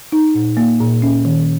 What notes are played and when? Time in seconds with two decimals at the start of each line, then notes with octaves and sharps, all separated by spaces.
0.12 D#4
0.35 A#2
0.57 A#3
0.80 A#2
1.02 C#4
1.25 D#3